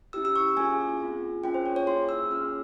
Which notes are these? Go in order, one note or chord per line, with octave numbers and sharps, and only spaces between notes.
C#4 E4 G4 E6
E6
C#6
A#3 C#4 F4 G#4 G#5
C4 F4 G#4
A#3 C#4 F4 G#4 G5
C5
C#5
C#5
A#3 E4 G#4 C6
E6
C#4 F4 G#4 F6